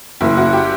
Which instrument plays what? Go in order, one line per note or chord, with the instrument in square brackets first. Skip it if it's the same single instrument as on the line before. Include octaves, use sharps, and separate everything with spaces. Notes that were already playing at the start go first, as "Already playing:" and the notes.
[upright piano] F#1 [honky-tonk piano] E4
[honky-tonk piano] F#4
G4